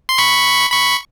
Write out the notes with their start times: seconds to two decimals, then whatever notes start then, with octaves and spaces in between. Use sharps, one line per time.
0.09 C6
0.18 B5 C#6
0.72 B5 C#6